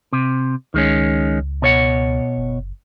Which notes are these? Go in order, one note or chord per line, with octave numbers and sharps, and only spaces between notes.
C3
C#2 D#3 G#3 C#4
B2 C#5 F#5
F#1